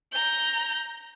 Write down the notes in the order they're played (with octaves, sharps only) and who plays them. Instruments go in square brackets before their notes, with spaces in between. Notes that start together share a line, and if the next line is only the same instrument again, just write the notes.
[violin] A#5 G6